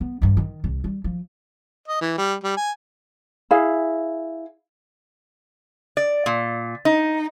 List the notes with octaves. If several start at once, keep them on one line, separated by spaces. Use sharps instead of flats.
B3
D2 G2
D#3
C2
G3
F3
D#5
E3
G3
G3
G#5
E4 G#4 F5
D5
A#2
D#4